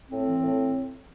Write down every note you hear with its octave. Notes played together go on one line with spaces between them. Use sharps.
A2 C4
E3
A2